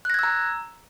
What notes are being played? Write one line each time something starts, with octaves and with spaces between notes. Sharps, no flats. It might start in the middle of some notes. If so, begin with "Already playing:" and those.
A#5 E6 F#6 G#6 A#6